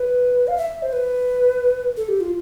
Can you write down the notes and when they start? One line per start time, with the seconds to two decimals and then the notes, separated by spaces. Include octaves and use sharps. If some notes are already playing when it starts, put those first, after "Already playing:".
Already playing: B4
0.48 F5
0.58 E5
0.82 C5
0.93 B4
1.97 A4
2.08 G4
2.21 F4